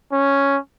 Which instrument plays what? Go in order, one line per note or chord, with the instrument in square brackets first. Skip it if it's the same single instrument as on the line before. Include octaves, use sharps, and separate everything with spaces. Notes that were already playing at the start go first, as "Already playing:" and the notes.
[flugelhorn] C#4